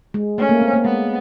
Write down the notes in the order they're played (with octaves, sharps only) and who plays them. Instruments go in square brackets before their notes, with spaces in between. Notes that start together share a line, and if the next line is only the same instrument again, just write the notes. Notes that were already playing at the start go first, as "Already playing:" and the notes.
[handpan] G#3
[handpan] A3 [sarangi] C#4
[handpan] A#3
C4
A#3
[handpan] G#3 [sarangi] B3